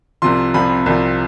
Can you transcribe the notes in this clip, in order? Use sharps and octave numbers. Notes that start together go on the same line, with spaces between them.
C2 C3 F3 C6
C2 C3 F3 B5
C2 C3 F3